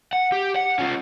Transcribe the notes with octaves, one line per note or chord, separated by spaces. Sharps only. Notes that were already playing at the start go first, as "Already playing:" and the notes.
F#5
G4
F#5
C#4 F4